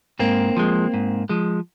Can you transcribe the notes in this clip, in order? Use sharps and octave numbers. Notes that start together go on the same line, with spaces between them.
G#2 A#3 C4
F3 G#3
G#2
F3 G#3